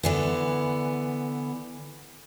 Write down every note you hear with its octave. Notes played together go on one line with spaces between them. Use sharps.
D3 E3 B3